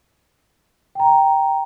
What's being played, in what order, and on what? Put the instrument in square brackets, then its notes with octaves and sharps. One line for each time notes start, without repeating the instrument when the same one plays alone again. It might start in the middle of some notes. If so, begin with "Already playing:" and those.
[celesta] G5 A#5